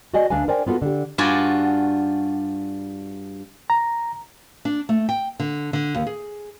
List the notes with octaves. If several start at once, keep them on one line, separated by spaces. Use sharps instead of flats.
F#4 D5 D#5 G#5
D2 D4 B4 F5 G#5
A#4 C5 D5 G5 G#5
B3 F4 F#4 A4
D3 G4
G2 F4 F#4 D5 F#5 G#5
A#5
D4
A3
G5
D3
D3
D#2
G#4